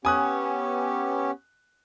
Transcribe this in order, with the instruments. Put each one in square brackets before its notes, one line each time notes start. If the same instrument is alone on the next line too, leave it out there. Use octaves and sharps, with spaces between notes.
[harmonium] B3 C#4 G4 [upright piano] G#5 D#6 F#6